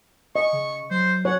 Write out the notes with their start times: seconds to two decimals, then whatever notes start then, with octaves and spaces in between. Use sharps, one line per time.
0.36 D#5 C#6
0.53 C#3
0.91 F#3 C5
1.25 C#5 F#5